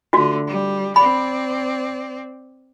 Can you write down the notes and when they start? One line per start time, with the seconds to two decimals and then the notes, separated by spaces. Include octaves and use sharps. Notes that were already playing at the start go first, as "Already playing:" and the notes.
0.13 D3 A3 F4 F#4
0.47 G3
0.96 C4 D5 B5